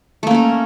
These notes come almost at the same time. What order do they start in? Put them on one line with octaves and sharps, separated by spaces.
A3 A#3 C#4 A#4